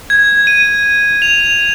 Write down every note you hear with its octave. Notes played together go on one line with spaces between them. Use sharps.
G#6
D#7
F7